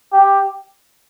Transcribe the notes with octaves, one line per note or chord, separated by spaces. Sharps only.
G4